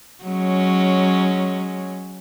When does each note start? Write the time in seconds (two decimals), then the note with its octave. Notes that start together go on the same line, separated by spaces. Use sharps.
0.24 F#3 G#3 C#4